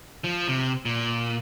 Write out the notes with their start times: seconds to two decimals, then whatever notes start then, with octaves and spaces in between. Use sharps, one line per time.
0.24 F3
0.49 C3
0.85 A#2